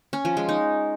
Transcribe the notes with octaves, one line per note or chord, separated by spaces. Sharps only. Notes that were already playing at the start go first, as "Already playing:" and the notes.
C#4
F3
G#3
D#4